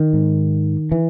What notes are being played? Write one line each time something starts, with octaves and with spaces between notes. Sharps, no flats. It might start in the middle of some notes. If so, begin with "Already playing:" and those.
Already playing: D#3
G#2
E3